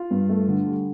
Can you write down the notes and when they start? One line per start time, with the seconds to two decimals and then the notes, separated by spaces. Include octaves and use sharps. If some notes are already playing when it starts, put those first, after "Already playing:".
Already playing: F4
0.11 G2
0.29 A3
0.48 D3
0.67 G3